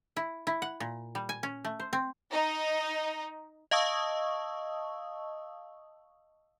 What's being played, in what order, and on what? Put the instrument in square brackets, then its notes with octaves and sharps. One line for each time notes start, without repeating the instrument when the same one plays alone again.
[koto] E4
E4
F#5
A#2
G3
G#5
C#4
A3
C5
C4
[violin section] D#4
[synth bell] D#5 F5 A5 C#6 D#6 E6